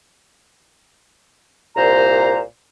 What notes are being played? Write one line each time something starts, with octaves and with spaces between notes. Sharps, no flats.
C2 A#2 C5 A#5